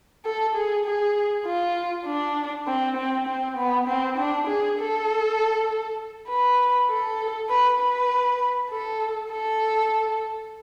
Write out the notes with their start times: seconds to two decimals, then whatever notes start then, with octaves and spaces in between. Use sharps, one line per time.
0.25 A4
0.55 G#4
0.85 G#4
1.46 F4
2.06 D4
2.67 C4
2.97 C4
3.27 C4
3.57 B3
3.88 C4
4.18 D4
4.47 G#4
4.78 A4
6.29 B4
6.90 A4
7.49 B4
7.80 B4
8.71 A4
9.31 A4